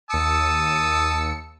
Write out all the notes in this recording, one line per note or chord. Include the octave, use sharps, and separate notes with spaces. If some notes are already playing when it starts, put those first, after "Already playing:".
D#2 A5 D#6 E6 C#7